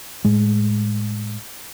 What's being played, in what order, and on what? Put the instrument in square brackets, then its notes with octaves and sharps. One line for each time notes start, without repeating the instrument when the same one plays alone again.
[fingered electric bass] A2 G#3